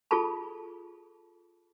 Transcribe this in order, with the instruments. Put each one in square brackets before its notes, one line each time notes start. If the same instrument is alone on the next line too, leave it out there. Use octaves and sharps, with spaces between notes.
[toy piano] F4 G#4 A4 A5 B5